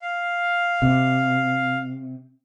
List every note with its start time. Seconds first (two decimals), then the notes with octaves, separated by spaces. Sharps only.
0.02 F5
0.82 C3